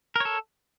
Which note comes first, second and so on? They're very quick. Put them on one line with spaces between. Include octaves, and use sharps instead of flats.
A#4 C#5 A4